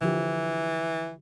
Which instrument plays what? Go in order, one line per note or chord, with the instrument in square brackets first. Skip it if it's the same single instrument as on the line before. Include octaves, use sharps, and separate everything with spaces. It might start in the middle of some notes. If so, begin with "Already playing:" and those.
[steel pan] D3 F3 G4 [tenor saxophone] E3